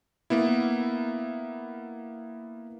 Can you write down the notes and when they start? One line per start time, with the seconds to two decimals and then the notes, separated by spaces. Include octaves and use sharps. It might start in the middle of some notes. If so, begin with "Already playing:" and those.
0.30 A#3 B3 E4